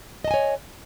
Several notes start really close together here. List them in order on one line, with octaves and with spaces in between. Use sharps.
D#5 A5 G#5 C#5